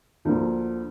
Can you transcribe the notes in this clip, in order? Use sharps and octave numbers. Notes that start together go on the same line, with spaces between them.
D2 D3 F3 A#3